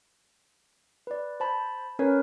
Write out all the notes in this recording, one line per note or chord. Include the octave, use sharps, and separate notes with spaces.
B4 D5
C5 A5 B5
C#4 A#4 B4 C#5